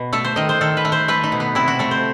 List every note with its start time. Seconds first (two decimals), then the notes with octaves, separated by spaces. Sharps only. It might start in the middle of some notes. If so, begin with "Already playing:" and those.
Already playing: B2
0.13 A3 A4
0.24 C5
0.36 D#3 D#5
0.49 C5
0.61 D#3 A4
0.77 B4
0.85 A3
0.92 C5
1.08 A3 B4
1.24 D#4
1.32 B2
1.40 B3
1.55 C3 E4
1.68 F#4
1.79 A3 A4
1.91 C5